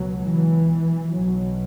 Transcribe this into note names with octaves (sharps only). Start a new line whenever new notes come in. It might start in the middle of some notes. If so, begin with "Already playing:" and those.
Already playing: C#2 B2 F#3
E3
B1 B2 F#3